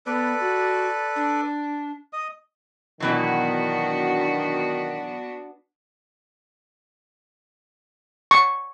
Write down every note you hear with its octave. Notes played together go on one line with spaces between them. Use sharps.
B3 A4 B4 D5
F#4
D4
D#5 D#6
B2 D#3 E3 F#3 B3 D4 F#4
C#6